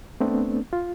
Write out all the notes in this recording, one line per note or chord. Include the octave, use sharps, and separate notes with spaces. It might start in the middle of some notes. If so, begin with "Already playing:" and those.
A3 B3 C4 D4
F4